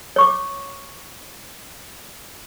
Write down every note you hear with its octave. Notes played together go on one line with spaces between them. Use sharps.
C#5 C#6 D6